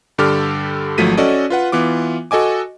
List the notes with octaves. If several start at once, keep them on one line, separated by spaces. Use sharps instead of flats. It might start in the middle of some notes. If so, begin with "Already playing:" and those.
G2 D3 G4 A4 D6 F6
G#1 F3 F#3 A3 B6 D#7
C#4 F#4 A4 D5 D#5
F4 B4 F#5
E3 B3 F4 D6
F#4 A4 D#5 G#5 D6